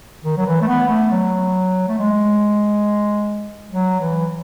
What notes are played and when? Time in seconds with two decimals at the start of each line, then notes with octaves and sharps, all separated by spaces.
0.24 D#3
0.37 F#3
0.46 E3
0.62 A3
0.68 B3
0.89 A3
1.11 F#3
1.88 A3
1.98 G#3
3.71 F#3
4.01 E3